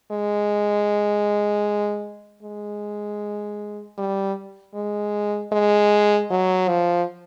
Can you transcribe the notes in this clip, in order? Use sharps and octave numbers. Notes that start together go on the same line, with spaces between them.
G#3
G#3
G3
G#3
G#3
F#3
F3